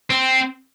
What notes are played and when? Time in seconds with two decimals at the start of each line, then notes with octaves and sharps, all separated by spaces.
0.10 C4